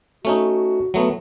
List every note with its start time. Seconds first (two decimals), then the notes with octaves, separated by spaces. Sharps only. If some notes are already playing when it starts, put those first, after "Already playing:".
0.25 A3 C#4 D#4 F#4
0.94 F#3 A3 B3